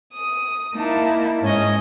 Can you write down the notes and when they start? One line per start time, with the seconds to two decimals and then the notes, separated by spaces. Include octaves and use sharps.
0.13 D#6
0.75 A#3 D#4 E4 A5
1.43 G#2 C#4 D#5 A#6